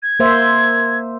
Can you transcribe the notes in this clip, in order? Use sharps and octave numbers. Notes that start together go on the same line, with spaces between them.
G#6
A#3 C5 E5